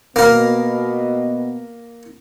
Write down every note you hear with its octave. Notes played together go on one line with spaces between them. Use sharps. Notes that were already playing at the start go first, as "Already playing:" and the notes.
B2 A#3 B3 A#4